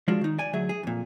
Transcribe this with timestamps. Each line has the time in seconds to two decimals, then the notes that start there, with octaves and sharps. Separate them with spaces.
0.08 F3 G#3 D4 F4 F#4
0.21 D#3 D#4
0.39 D5 G#5
0.53 D2 F#3 G#4 E5
0.69 G#4
0.83 F2 A#2